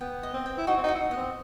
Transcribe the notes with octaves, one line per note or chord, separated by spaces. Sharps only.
B3 G5
D#5
C4
G5
E4
D#4 F#4
C4
D#4 F#4
E4
D#4
B3 D#5
C4